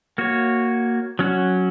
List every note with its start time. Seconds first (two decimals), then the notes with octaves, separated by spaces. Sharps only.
0.18 A#3 F#4 C#5
1.19 F#3 C#4 F#4